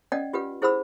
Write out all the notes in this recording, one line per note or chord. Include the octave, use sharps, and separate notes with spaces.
C#4 D5 D#5 F#5 G5
F4 G4 B4 F#5
E4 G#4 C5 F#5 B5 E6